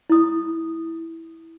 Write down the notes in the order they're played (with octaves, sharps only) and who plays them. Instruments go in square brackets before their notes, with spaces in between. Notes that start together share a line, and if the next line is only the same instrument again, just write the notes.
[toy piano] E4 D#6